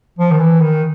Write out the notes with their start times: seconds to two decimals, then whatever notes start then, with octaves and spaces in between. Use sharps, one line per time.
0.19 F3
0.31 D#3
0.40 E3
0.61 D#3